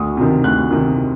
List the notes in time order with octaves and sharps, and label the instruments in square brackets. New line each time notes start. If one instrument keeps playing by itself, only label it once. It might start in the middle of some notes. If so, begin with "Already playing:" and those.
Already playing: [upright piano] D2 D#6
C3 D#3
D2 F#6
C3 D#3